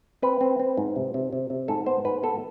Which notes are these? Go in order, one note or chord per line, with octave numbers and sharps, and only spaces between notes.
C4 B4
C4
C4
G#2
C3
C3
C3
C3
G#2 A4
B3 C5
G#2 B4
B3 A4